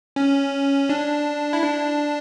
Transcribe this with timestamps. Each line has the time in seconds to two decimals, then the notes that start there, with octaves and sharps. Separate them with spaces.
0.16 C#4
0.89 D4
1.53 E4
1.62 D4